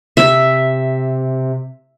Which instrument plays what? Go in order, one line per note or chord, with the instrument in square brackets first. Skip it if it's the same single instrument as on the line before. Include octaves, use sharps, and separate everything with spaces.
[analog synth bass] C3 [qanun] E5